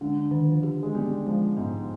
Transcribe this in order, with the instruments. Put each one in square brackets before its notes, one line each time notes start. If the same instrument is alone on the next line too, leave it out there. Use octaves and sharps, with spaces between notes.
[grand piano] D3 [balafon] G#3
[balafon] D#3
[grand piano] F3
[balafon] G4
[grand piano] G#3
[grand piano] G3 [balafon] B3
[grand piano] F3 [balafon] G#3
[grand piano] G#2 [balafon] B3